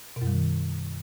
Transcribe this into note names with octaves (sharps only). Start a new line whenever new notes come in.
B2
F#2
G3
D#3